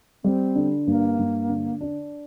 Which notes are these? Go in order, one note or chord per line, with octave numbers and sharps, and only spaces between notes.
G3 C4
D3
G2 A#3
G2
D3
D4